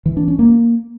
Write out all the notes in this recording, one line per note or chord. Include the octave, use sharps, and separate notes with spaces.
E3
D4
C#4
A#3